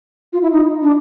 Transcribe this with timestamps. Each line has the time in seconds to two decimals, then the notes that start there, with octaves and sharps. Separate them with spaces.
0.33 F4
0.42 E4
0.52 D#4
0.82 D4